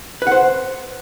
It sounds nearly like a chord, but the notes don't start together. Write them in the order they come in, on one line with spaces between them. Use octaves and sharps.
B4 F#5 C5